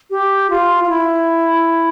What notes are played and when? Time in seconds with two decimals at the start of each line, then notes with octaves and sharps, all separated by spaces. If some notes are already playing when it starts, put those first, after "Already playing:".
0.10 G4
0.50 F4
0.84 F4
0.89 E4